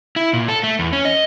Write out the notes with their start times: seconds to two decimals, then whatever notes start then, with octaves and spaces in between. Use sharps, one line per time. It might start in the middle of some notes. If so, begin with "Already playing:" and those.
0.16 E4
0.33 A#2
0.48 A4
0.63 A3
0.79 E2
0.93 C#4
1.05 D#5